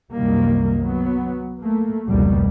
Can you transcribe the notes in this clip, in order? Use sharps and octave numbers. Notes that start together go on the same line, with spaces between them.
C2 F#2 C3 D#3 G3 A#3
F#3 B3
A3 A#3
F1 C#2 B2 G3 A#3